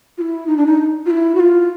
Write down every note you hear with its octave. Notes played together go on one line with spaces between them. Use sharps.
F4
E4
D#4
D4
D#4
F4
E4
F#4
F4